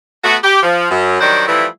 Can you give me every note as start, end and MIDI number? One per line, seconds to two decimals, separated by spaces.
0.24 0.37 57
0.24 0.37 59
0.24 0.37 66
0.44 0.61 67
0.63 0.91 53
0.91 1.18 42
1.21 1.46 51
1.21 1.46 54
1.21 1.46 55
1.21 1.46 62
1.21 1.46 72
1.48 1.66 52
1.48 1.66 53
1.48 1.66 55
1.48 1.66 57
1.48 1.66 64